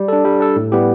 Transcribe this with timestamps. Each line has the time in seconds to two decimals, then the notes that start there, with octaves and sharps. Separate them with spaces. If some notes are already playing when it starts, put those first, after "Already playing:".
Already playing: G3
0.08 D4 A4
0.25 G3
0.40 D4 A4
0.56 A2
0.72 G3 B3 E4 G4